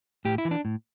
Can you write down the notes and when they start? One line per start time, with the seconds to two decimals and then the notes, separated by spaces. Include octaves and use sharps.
0.25 A2 G4
0.38 E4
0.45 E3
0.51 D4
0.65 A2